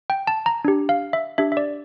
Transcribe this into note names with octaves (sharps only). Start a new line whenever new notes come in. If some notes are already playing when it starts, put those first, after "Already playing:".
G5
A5
A#5
D4 G4
F5
E5
D4 G4 E5
E5
D5